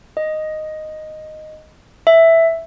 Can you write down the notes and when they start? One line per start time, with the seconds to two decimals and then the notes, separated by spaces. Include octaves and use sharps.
0.17 D#5
2.07 E5